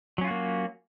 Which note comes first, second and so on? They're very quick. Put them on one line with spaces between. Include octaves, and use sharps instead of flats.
F#3 C#4 F4 F#4 A#3